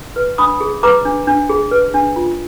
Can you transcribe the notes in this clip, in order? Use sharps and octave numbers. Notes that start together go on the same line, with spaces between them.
B4
D4 B5 D#6
G#4
B4 A#5 D6
D4
D4
G#4
B4
D4
F4